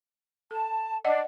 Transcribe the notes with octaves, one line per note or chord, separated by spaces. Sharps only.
A4 A5
D4 D5 D#5 F#5